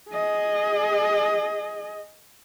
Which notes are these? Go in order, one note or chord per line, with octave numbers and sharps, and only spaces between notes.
G#4 D#5